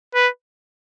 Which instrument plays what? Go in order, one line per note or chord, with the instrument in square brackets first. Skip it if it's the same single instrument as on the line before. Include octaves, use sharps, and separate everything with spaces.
[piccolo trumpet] B4